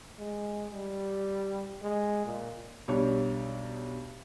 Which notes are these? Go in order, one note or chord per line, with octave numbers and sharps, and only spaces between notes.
G#3
G3
G#3
A#2
B1 G3 D4 C#5